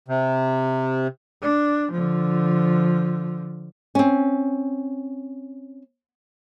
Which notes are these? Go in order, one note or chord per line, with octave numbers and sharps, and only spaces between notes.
C3
D4
D3 F3
C4 C#4